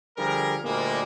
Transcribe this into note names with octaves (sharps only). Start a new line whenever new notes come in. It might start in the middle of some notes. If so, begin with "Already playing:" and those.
D3 F3 G3 G#4 A#4
D2 A#2 D3 G3 G#3 A#3